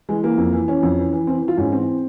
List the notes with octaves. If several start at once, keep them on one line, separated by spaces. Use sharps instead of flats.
E3 G#3
E3 A#3
F2
E3
E3 C#4
F2
E3
E3
E3 C4
E3
F4
G#2 C#4
E3 C4